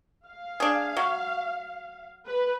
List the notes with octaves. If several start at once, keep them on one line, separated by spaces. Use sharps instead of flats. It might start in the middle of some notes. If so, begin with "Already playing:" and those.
F5
D4 G#4
F#3
B4